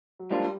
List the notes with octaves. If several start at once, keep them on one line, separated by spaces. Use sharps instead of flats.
F#3
G#2 F3 G3 A#3 D4 F4